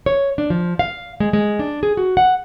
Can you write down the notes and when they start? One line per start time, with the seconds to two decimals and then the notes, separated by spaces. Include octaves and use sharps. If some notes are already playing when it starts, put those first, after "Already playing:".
0.06 C#5
0.38 D4
0.50 F3
0.79 F5
1.20 G#3
1.33 G#3
1.59 D4
1.83 G#4
1.97 F#4
2.17 F#5